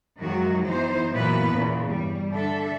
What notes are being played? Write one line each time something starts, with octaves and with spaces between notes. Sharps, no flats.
F#2 D#3 F3 F#3 G#3 F#4
E3 B3 D#4 C5
F#2 A#2 E3 A#3 B3 B4
E2 A#2 C#3
G2 G3
D3 D4 A4 E5